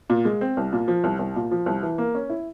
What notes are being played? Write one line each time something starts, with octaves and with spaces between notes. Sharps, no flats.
A#2
G#3
C4
C2
A#2
F3
C2
C2
A#2
F3
C2
E3
A#3
C#4
E4